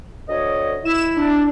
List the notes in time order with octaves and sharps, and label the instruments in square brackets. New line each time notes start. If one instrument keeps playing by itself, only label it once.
[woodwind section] D2 C#5 D#5
[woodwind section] E4 [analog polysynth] E7
[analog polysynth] D4